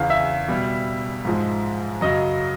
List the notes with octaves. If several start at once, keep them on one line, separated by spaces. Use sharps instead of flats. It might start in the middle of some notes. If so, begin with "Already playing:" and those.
Already playing: E2 C#3 E3 F5
E5
B2 G3
G#2 F3 G#3
F#2 C#3 F#3 D#5